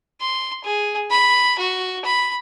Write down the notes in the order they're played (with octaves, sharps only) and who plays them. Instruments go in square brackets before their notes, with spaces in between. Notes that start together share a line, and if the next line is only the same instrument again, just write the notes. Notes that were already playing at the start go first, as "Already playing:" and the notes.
[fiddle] C6
G#4
B5
F#4
B5